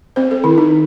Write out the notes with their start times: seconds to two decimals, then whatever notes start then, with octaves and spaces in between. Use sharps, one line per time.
0.16 C4 C5
0.31 A4
0.44 D#3 E4
0.58 D#4